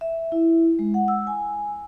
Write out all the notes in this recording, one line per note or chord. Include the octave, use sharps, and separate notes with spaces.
E5
E4
G#3
F#5
E6
G#5